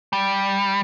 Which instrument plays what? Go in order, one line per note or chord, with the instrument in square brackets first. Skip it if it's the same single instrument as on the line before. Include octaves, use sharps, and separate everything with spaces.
[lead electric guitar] G3